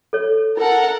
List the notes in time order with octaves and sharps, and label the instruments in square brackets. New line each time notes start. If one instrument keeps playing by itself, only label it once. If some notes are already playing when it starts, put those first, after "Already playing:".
[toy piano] A4 C#5
[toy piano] E4 [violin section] A4 A#4 F#5